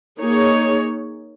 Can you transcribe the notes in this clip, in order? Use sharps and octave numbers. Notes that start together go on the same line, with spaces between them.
A#3 D#4 G#4 C#5